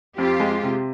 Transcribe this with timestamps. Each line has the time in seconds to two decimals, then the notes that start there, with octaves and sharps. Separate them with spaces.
0.17 F2 F4 G4
0.40 G#3
0.63 C3